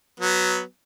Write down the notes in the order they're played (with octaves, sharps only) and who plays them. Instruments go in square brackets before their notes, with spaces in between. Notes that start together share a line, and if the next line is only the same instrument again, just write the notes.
[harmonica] F#3 B3